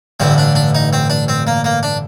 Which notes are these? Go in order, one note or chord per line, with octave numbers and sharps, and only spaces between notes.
A1 G2 D3 C4
D4
D4
D#4
C4
D4
C4
A#3
A#3
D4